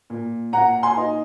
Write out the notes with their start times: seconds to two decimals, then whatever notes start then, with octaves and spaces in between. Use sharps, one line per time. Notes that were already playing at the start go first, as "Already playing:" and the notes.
0.10 A#2
0.53 A#2 F#5 A#5
0.83 G#5 C6
0.97 D#4